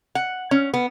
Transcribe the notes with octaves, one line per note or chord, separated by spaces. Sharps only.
F#5
C#4
B3